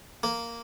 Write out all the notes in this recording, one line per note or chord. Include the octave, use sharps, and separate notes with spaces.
A#3